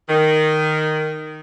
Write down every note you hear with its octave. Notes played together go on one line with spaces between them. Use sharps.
D#3